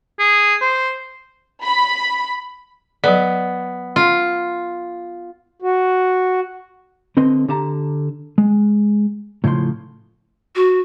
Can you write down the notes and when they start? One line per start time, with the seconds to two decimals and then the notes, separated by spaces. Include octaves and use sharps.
0.19 G#4
0.61 C5
1.64 B5
3.04 F#3 B3 D5
3.96 F4
5.62 F#4
7.17 D3 C4 B4 D#5 C6
7.48 D3 G4 A5 A#5
8.38 G#3
9.44 A2 C#3 F3 F5 C6
10.56 F#4